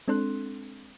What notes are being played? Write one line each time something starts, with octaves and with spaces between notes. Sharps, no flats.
G#3 C4 D4 A4 C6 F#6